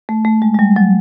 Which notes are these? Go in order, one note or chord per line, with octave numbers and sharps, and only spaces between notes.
A3
A3
G#3
G#3
G3
F#3